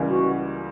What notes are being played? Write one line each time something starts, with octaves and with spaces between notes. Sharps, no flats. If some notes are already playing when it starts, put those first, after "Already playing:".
Already playing: C#2 C#3 E3 G3 A#3
F#4